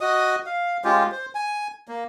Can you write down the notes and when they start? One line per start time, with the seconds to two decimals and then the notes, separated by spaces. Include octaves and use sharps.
0.01 F#4 D#5 D#6
0.46 F5
0.84 G#3 C#4 F4 G4
1.12 C5
1.35 G#5
1.88 A#3